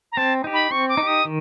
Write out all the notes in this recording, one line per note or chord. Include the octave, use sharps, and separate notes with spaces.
A#5
C4 A5
D#4 G4
B5
C4 C#6
D6
D#4
G4 D#6
D#3